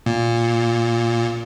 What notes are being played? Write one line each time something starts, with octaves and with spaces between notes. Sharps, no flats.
A#2